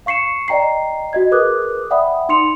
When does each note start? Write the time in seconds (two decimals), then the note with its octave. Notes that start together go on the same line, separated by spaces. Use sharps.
0.06 F5 C#6 C7 C#7 E7
0.48 D5 D#5 G5 A#5 C7
1.13 F#4 D#5 G#6
1.31 G#4 A#4 B4 D6 D#6 F#6
1.90 D5 E5 F#5 G5 B5 D#6
2.29 D#4 C6 C#7 F7